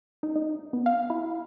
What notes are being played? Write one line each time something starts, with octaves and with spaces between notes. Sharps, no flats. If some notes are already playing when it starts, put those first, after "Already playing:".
D#4
D#4
B3
F5
E4